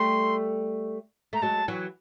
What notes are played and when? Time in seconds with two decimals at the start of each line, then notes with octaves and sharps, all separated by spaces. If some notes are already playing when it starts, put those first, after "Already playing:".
Already playing: G3 A3 C6
1.33 A3 A#5
1.42 F#3 G#3 A5
1.68 E3 F#3